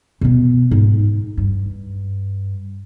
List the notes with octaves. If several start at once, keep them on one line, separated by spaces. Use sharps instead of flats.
B2 B3
G#2
G2